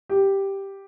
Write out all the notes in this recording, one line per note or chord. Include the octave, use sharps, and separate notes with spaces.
G4